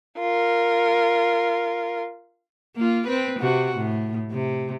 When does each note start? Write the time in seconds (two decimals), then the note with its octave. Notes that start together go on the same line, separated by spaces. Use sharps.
0.18 F4 A#4
2.76 A#3 F4
3.07 C4 B4
3.39 C3 F#4
3.77 A2
4.30 C3